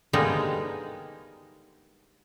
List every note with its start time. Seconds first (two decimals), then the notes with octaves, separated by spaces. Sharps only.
0.13 D3 G3 G#3 A#3 B3 D#4